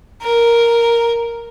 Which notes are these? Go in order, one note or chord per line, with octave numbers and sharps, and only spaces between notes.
A#4